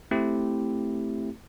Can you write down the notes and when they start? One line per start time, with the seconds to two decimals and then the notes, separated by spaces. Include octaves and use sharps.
0.11 A3 C4 E4 G4